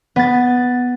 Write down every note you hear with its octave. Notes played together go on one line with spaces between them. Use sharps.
B3 A6